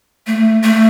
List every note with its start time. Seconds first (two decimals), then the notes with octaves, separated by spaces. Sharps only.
0.27 A3
0.64 A3